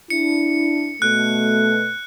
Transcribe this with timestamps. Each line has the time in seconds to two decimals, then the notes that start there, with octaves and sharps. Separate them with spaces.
0.10 D4 E4 C#7
1.02 B2 A3 F#6